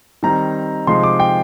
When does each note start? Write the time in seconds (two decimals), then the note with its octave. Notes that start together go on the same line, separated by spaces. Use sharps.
0.23 D#3 G3 C4 D#4 A#5
0.87 C3 F3 G#3 D#4 C6
1.03 D6
1.20 G5